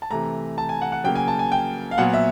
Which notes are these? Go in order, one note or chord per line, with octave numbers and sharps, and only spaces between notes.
A5
C3 E3 A3 A#5
A5
G#5
F#5
F#5
C#3 F#3 A#3 G5
G#5
A5
G#5
G5
F5
A#2 F#3 B3 F#5
E5